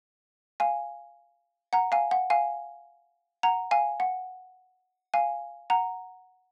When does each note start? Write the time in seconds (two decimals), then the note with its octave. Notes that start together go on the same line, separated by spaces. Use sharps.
0.60 F5 G#5
1.73 F#5 A#5
1.92 F5 G#5
2.11 F#5
2.30 F5 G#5
3.43 F#5 A#5
3.71 F5 G#5
4.00 F#5
5.14 F5 G#5
5.70 F#5 A#5